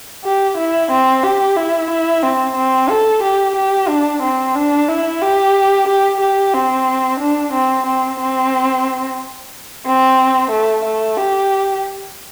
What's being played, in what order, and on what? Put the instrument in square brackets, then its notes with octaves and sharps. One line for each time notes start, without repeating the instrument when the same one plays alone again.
[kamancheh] G4
E4
C4
G4
E4
E4
C4
C4
A4
G4
G4
D4
C4
D4
E4
G4
G4
G4
C4
D4
C4
C4
C4
C4
A3
A3
G4